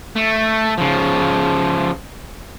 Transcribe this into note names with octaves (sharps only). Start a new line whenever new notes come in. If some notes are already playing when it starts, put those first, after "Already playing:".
A3
C#3 F3